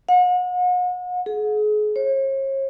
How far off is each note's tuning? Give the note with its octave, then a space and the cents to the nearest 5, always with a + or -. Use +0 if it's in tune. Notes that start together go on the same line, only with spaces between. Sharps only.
F#5 -40
G#4 +35
C#5 -45